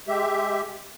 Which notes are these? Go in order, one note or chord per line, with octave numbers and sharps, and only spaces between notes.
G#3 G4 E5